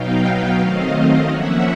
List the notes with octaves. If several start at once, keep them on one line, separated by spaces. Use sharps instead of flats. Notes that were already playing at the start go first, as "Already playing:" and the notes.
Already playing: B2 F#3 B3 D#4 F5 G5
F5 G5
D#3 F#3 A3 C4 D#5 F5
D#5 F5
F3 A#3 C#4 E5 F#5